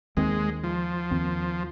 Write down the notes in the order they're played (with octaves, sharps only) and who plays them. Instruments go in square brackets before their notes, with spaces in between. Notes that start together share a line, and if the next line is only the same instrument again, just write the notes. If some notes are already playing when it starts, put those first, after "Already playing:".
[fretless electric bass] D#2 D#3 C4 [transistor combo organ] G#3
[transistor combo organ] F3
[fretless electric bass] D#2 D#3 C4